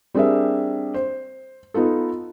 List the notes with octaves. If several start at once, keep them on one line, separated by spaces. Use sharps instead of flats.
G3 C4 D4 G#4 A#4 E5
C5
B3 D#4 F4 A4